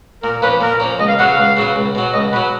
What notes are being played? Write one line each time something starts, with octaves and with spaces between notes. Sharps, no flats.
A#2 A#4
F3 A#3 C#4 B4
A#2 A#4
F3 A#3 C#4
C#2 D#5
F5
C#3 F#3 B3 F#5
F5
C#2
C#3 F#3 B3
C#2
B2 F#3
C#2 D#5
B2 F#3 B4